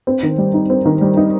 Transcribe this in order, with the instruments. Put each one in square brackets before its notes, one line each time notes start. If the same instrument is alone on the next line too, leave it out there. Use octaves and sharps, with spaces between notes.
[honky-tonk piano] C4
D#3
G3
D#4
C4
D#3
G3
D#4